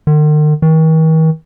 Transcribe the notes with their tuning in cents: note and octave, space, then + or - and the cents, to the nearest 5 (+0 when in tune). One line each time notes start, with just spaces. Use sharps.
D#3 -45
D#3 +45